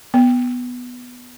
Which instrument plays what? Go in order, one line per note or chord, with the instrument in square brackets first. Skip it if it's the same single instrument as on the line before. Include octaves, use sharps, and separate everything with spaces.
[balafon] B3